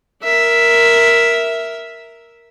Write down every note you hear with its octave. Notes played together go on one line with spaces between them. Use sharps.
A#4 E5